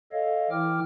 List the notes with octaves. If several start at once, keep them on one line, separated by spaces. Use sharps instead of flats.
A4 C#5 D#5 F5
E3 E4 G5 D6 F6